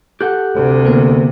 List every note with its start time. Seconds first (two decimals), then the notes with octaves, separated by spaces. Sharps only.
0.21 G4 A4 F#5 F#6 G6
0.55 D2 C3
0.85 D3 A#3 B3 A#4